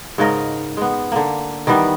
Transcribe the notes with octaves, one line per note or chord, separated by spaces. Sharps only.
G#2 C#3 A#4 D#5
G#3 B3
D3 A#3
D#3 E3 G3 B3